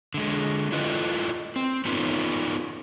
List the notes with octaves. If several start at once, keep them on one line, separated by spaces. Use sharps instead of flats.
D3 G#3
E4 F4 A4 B4 D#5
C4
B3 C#4 D#4 F4 A4 B4